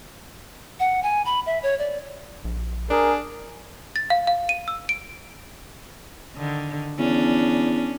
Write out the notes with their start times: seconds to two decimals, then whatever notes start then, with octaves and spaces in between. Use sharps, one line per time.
0.80 F#5
1.03 G#5
1.26 B5
1.46 E5
1.63 C#5
1.79 D5
2.44 A#1
2.90 D4 G#4 A#4
3.96 A6
4.10 F5
4.27 F5
4.49 D#7
4.68 E6
4.89 D7
6.35 D3 D#3
6.99 E2 C#4 D4